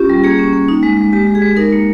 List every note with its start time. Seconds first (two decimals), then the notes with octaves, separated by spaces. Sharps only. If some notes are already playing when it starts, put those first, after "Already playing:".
Already playing: C#4 F4 G4
0.10 G3
0.24 A#3 G#4
0.39 C#4
0.53 A#3
0.68 D#4
0.83 G#3
0.97 G#3
1.13 G#3 G4
1.27 G#3
1.35 G#4
1.42 G#3
1.57 D#4 A#4
1.73 A#3